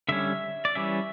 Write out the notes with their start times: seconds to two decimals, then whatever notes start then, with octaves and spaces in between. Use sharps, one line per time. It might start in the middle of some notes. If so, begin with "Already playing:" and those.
0.09 D3 G3 C#4 E5
0.65 D5
0.75 E3 G3 C#4 E5